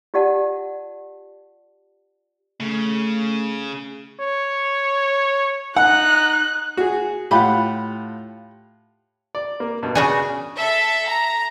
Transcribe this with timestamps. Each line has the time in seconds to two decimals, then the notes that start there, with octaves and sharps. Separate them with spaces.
0.14 F4 G4 D5 F#5 A5
2.60 C#3 A3
4.20 C#5
5.77 D#4 F#5 F#6
6.77 F#4 G#4
7.31 A2 F4 G4 F#5 B5
9.35 D5
9.60 A#3
9.83 G2 B2
9.95 C#3 D4 F#4 G#4
10.56 A4 E5
11.08 A#5